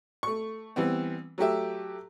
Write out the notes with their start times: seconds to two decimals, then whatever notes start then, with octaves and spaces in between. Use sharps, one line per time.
0.23 A3 C#6
0.76 E3 G3 B3 C4
1.38 F#3 A3 G4 E5